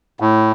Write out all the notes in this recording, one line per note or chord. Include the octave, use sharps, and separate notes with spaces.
A2